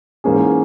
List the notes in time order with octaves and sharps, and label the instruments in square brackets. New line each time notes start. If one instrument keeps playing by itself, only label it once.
[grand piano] G#2 E3 A#3 C#4 G#4